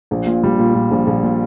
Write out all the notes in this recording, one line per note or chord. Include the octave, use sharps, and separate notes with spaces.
A#1
A#2
G3
A#2
A#2
A#1
A#1
A#2